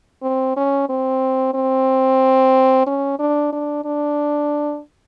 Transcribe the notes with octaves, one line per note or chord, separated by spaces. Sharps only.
C4
C#4
C4
C4
C#4
D4
D4
D4